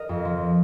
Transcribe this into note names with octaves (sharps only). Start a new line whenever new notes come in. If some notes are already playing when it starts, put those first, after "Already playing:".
Already playing: A#4 D#5
F2
F3